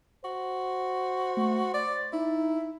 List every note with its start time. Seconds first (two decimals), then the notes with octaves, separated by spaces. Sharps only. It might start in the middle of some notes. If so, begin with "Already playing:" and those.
0.25 F#4 C5
1.37 A3
1.74 D5 A6
2.13 D#4 E4